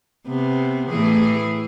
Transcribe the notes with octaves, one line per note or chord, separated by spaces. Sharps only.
C3 B3
A2 E3 G#4